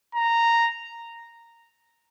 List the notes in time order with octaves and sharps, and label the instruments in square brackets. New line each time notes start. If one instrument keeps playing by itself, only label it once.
[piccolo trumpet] A#5